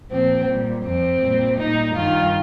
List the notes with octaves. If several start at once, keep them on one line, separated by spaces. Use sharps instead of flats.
A#2 F3 C4
A#2 G3
F2 F3 C4
A#2 G3
A#2 G3 D#4
G2 D#3 G3 F4